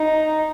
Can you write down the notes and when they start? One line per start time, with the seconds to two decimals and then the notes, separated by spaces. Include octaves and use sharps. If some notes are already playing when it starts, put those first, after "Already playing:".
Already playing: D#4